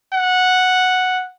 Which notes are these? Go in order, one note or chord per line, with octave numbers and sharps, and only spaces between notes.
F#5